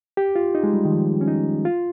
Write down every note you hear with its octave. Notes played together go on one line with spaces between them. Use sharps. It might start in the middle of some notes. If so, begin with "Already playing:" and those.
G4
F4
D#4
G#3
G3
D#3
F3
C#4
D#4
F4